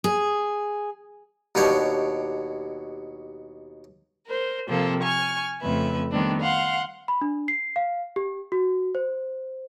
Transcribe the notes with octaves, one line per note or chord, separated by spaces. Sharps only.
G#4
D#2 B2 D4 G4 C#5
A#4 C5
C3 F3 A#3 C4 A4
G#5 C#6 F6
F2 C#3 A3 B4 E5
D#3 G3 A3 B3 C4 D4
F5 F#5 C6
B5
D4
C7
F5
G4
F#4
C5